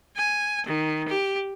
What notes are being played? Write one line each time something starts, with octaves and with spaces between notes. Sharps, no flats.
G#5
D#3
G4